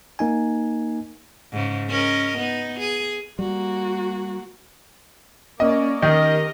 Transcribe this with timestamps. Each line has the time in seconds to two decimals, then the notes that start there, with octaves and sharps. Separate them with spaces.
0.19 A#3 D#4 G#5
1.52 G#2 C#3
1.89 C#4 A#4 D#5
2.38 B3 D#4
2.80 G#4
3.39 G3 A#3 F#4
5.60 A#3 C#4 D5 D#5
6.02 D#3 D#4 G4 A#4 D#5